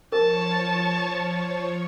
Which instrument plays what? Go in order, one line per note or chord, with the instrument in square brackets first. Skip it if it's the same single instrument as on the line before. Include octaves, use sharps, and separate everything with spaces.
[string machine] F3 C#5 C#6 [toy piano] A#4 [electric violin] A5